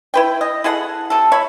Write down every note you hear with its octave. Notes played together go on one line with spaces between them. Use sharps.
E4 B4 G5
D#5
E4 G#4 A4 F#5
C3 A4
C#5 E5 B5